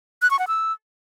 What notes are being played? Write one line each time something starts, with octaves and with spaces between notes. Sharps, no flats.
F#6
C#6
F#5
E6